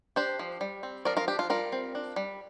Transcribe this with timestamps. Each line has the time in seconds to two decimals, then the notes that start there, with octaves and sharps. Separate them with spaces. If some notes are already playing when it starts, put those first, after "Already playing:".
0.16 D4 G4 C5
0.39 F3
0.61 G3
0.83 C4
1.05 F3 A#4 D5
1.17 F4 A#4
1.28 D4 G4
1.39 F4
1.50 G3 F4 A#4
1.72 C4
1.95 D4
2.16 G3